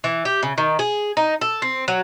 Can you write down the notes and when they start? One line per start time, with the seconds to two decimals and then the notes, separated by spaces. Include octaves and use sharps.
0.04 E3
0.25 G4
0.43 C#3
0.58 D#3
0.79 G#4
1.17 D#4
1.41 A4
1.62 C4
1.88 F#3